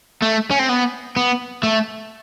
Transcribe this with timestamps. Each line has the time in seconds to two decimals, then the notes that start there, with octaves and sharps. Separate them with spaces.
0.22 A3
0.51 C#4
0.59 C4
0.69 B3
1.17 B3
1.63 A3